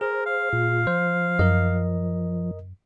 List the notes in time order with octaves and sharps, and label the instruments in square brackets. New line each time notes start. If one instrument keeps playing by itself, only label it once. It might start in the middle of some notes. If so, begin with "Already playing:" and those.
[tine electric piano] G#4 [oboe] A#4 [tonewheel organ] C5
[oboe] F5
[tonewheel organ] A#2 F4
[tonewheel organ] F3 [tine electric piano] C5
[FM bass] F#2 [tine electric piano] A#4 D#5